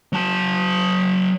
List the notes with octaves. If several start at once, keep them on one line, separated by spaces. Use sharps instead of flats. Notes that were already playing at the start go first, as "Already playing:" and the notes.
F#3 A5